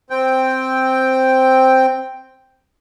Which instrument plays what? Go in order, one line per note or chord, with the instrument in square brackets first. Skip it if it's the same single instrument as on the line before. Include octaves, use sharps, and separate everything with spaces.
[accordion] C4 G5